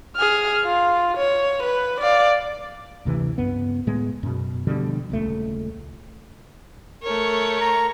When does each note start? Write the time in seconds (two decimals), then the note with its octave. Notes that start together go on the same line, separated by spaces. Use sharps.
0.17 G#4 F6
0.64 F4
1.17 C#5
1.63 B4
2.00 D5 F5
3.05 F#1 D2 C3 E3
3.38 C#2 G2 B3
3.87 A2 G#3 B3
4.23 F#2 B2
4.67 B2 D3 F3 G3
5.10 D#1 C#2 A3
7.03 A3 A#4 C#5
7.61 A#5